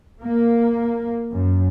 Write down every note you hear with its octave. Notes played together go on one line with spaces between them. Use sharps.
A#3
F#2